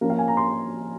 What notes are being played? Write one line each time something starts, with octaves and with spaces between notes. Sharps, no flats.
F3 A#3 C#4 A#4
F5
G#5
A#5
C6